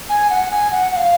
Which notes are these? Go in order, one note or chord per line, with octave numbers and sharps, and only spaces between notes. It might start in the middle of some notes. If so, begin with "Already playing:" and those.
G#5
F#5
G#5
F#5
F#5
F5